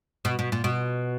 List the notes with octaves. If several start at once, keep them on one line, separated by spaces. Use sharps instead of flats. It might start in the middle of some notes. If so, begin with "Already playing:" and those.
B2
B2
A#2
B2